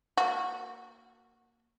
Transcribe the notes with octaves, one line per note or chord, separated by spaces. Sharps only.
A#3 F#4